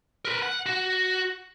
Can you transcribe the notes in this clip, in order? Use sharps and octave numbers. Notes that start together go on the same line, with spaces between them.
A#4 B4
F#5
F#4